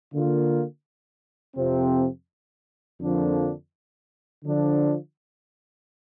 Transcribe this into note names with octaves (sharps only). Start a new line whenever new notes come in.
D3 A#3 F4
F2 C3 F3 C4
F2 D3 F3 A#3 D4
D3 F3 D4